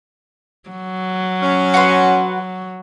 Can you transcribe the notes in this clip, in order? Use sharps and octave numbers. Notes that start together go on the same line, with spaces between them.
F#3
C#4
F#4 B4 C6